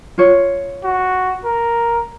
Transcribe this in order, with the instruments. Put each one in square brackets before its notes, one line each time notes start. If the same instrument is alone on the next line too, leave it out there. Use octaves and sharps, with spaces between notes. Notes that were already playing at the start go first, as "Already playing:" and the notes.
[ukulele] F4 C#5
[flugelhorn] F#4
A#4